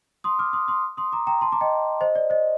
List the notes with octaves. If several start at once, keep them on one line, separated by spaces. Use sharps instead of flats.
C6 D#6
D6 F6
C6 D#6
C6 D#6
C6 D#6
A#5 D6
G5 A#5
A5 C6
A#5 D6
D#5 G5
C5 D#5
D5
C5 D#5